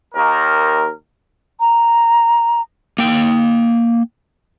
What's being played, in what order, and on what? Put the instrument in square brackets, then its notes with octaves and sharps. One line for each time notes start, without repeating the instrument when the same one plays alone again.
[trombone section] D#2 A#4
[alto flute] A#5
[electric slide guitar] A#3 G5